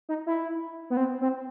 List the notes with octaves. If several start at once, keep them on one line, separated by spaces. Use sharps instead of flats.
D#4
E4
B3
C4
C4